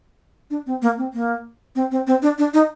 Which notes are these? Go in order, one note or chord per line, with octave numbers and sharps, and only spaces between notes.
D4
C4
A#3
C4
A#3
C4
C4
C4
D4
D4
D#4